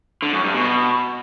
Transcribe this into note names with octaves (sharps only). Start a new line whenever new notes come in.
D3
F#2
G2
B2